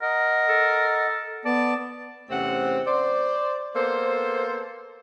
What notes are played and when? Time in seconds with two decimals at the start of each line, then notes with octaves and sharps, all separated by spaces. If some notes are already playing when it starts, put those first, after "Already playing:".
0.02 A#4 D#5 F#5
0.48 A4
1.45 B3 D5 A5
2.29 E2 C3 A3 C4 C#4 F#5
2.86 C5 D5
3.75 A#3 B3 A4 C5